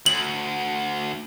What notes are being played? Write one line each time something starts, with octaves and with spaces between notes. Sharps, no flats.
D2 F#7